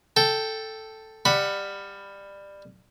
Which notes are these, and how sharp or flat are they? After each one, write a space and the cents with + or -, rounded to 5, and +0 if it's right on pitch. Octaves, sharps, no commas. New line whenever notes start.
A4 +0 G5 +0
G3 +20 F#5 +0 B5 +0